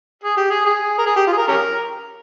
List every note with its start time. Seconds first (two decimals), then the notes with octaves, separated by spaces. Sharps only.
0.24 G#4
0.37 G4
0.50 G#4
0.65 G#4
0.98 A#4
1.06 G#4
1.16 G4
1.27 F4
1.32 G#4
1.38 A#4
1.48 C#4 G4 A#4